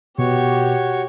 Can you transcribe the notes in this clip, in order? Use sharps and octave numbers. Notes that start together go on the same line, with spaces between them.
B2 F#4 G4 C#5 C#6